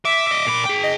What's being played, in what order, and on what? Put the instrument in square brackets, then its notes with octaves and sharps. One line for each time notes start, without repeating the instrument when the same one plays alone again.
[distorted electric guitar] E5 [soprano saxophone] D6
[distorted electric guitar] D#5 E5
A#2 B5
G#4 G5
[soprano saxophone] D#5